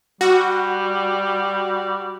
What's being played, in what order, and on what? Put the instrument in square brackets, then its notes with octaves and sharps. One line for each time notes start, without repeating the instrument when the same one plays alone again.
[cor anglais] G3 [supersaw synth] F#4